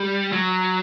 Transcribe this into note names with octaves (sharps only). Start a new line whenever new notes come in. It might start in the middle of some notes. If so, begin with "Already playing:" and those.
Already playing: G3
F#3